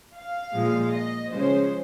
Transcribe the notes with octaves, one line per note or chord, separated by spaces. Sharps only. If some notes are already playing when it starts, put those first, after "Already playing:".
F5
A#2 F3 G#3
D#5
C#3 F3 G#3 C#4 C5